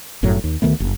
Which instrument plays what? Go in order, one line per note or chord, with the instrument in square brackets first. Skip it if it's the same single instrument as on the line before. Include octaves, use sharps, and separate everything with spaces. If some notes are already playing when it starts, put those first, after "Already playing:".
[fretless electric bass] G1 F#2 A2 F#3
D#2
D2 D#3 A3 B3
F#1